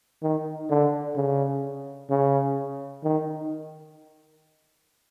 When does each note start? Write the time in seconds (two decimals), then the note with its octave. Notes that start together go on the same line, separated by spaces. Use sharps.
0.22 D#3
0.70 D3
1.16 C#3
2.10 C#3
3.03 D#3